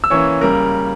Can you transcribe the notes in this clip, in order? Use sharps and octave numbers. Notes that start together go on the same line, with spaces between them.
E6
E3 A#3 C#4 C#5 C#6
C#3 G3 A#3 A#4 A#5